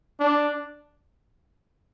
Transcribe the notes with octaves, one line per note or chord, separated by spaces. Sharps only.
D4